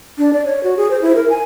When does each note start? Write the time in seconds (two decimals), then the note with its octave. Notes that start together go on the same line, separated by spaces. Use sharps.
0.18 D4
0.33 D5
0.45 C#5
0.64 F#4
0.77 G#4
0.90 C5
1.02 E4
1.16 A#4
1.30 G#5